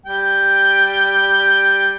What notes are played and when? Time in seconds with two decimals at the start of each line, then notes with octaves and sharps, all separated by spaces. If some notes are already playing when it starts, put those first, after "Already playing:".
0.06 G3 G5